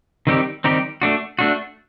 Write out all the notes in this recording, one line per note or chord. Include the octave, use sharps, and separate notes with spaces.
D#3 G3 C4 D#4 G4
D#3 G3 C4 D#4 G4
A3 D4 F#4
A3 D4 F#4